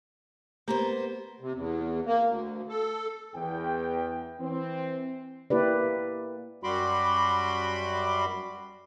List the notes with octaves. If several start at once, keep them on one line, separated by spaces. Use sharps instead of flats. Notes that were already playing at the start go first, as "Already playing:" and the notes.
A#3 B3 G4 C5 A#5
C3
E2
A#3
D2
A4
E2 G5
E3 C4
A#3 E4 G4 B4 D5
F#2 G3 F#4 B5 C6 D6